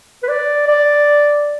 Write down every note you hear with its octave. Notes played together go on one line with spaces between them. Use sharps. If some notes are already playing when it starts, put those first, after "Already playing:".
B4
D5
D5